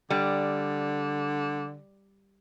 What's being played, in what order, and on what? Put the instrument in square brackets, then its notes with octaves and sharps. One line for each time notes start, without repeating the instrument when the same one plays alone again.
[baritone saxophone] D3 [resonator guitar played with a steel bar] G3